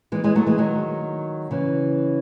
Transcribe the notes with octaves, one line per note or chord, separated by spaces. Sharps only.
E3 G#3
E3 G#3
F#3 A3
E3 G#3
D#3 F#3
C#3 E3